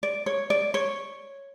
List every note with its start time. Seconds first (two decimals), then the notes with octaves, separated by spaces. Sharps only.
0.03 D5
0.26 C#5
0.50 D5
0.74 C#5